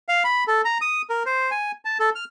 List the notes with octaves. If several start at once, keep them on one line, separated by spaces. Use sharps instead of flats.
F5
B5
A4
A#5
D#6
A#4
C5
G#5
A5
A4
F6